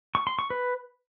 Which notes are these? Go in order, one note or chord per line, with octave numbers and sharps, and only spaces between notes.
C#6
C6
C#6
B4